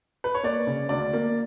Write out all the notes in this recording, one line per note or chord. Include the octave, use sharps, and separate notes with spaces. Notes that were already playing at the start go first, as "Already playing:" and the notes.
B4
C#5
A#3 D5
C#3
D2 D5
A#3